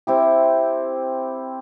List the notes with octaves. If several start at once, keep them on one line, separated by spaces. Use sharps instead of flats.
C4 E4 G4